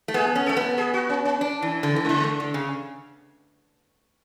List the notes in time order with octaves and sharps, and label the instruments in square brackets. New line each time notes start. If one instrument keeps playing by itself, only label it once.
[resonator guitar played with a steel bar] A3
[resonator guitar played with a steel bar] B3 [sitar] G#4
[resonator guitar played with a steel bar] C#4
[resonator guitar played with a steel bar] A3 [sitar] A4
[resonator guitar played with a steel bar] B3
[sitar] G#4
F#4
C#4
C#4
[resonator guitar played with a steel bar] D4
E3
D3
E3
[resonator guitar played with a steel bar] D3 [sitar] G#3
[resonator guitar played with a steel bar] D3
C#3